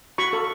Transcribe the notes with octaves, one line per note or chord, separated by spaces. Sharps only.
F#4 B5 C#6
A4